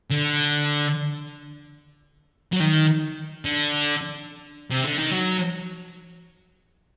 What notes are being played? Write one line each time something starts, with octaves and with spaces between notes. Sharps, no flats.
D3
F#3
D#3
D3
C3
D3
D#3
F#3